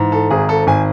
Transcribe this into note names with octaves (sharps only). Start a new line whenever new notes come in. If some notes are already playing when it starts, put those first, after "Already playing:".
Already playing: G#2 E3
A4
G#1 G#4
A4
G#1 G#5